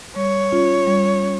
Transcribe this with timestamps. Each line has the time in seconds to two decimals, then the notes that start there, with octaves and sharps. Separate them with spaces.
0.16 G3 C#5
0.52 C#4 F4
0.87 G3
1.23 C#4